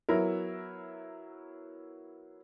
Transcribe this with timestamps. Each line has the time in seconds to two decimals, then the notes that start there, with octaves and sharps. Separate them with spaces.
0.09 F#3 B3 E4 A#4